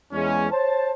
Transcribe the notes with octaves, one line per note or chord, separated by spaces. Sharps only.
E2 G#3 C#4
C5 C#5 A5